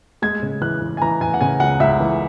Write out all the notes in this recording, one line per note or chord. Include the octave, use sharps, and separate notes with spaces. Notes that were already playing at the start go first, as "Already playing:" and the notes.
G#3 G#6
C#3
E3 F#6
E3
G#5
E3 A#5
E3 G#5
F#5
C#3 G#5
C#2 F#5
C#2 E5
E3